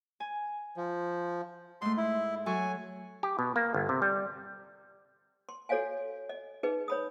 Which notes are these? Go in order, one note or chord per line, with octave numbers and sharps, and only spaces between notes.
G#5
F3
G#2 A3 C6
E4
F#3 A4 G#5 C#6
G4
B2
A#3
G1
C3
G3
C6
F#4 A4 C#5 D#5 F5 G#5
D#5
D#4 G#4 B4 D#5
C#5 B5 D#6